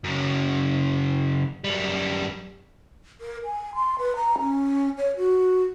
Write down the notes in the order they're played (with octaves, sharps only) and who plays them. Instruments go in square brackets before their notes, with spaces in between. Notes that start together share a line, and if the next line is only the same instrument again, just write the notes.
[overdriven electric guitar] F#2 C#3
F#2 G3
[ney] A#4
G#5
C6
B4
A#5
C#4
C#5
F#4